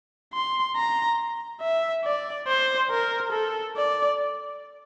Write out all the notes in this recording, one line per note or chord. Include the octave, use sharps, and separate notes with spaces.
C6
A#5
E5
D5
C5
A#4
A4
D5